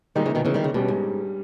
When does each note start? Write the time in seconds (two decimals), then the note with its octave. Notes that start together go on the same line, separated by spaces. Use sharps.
0.15 A#2 D#3 G3 G#3 D#4
0.26 C#3 E3
0.35 B2 D#3
0.45 C#3 E3
0.54 D#3 G3
0.64 C#3
0.74 G2 B2 G3 C#4
0.89 G#2